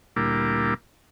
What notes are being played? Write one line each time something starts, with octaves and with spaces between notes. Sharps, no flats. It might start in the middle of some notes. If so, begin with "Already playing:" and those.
D2 A#2 G3 A#3 E4 D6